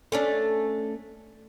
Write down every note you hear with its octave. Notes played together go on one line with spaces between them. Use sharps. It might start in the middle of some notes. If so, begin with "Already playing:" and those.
A3 C#4 D4